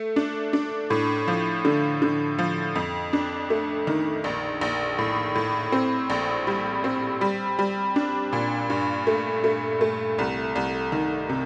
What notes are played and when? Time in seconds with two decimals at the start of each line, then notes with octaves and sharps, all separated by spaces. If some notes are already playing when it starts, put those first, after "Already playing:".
Already playing: A3
0.16 D4
0.53 D4
0.90 A2
1.28 F3
1.65 D3
2.02 D3
2.38 F3
2.76 F2
3.13 D4
3.50 A3
3.87 D#3
4.24 A#1
4.61 A#1
4.99 A2
5.35 A2
5.72 C4
6.10 A#1
6.47 G3
6.84 C4
7.21 G3
7.59 G3
7.96 D4
8.33 A#2
8.70 G2
9.07 A3
9.44 A3
9.81 A3
10.18 C2
10.55 C2
10.92 D#3
11.29 C3